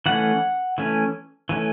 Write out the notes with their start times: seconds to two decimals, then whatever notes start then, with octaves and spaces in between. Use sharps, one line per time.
0.06 E3 A3 C#4 F#5
0.78 E3 A3 C#4
1.49 E3 A3 C#4